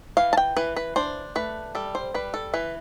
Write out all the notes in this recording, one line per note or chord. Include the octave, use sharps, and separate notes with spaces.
E3 F5
A5
G5
E3 B4
B4
D4 C5
A3 B4
G3 A4
C5
G3 B4
A4
E3 B4